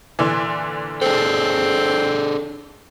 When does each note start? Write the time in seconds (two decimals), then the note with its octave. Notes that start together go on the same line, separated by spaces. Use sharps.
0.19 A#2 D3 E3
1.02 C4 D4 G#4 A4